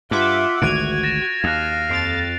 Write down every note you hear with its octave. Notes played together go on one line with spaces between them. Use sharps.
G2 F4 E5 F#5 D6
G#1 D2 G#2 F#4 G#6 D7 D#7 F7
A6 A#6 E7
D#2 F5 F#6 A#6 F7
F2 A6 C7 D7 F7